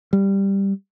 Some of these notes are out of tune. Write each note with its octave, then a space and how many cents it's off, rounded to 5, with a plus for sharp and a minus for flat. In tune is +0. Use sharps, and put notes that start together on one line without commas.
G3 +5